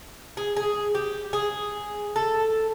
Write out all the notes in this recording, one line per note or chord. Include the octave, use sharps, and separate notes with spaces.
G#4
G#4
G4
G#4
A4